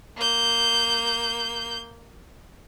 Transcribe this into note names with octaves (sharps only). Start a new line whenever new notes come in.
A#3 G6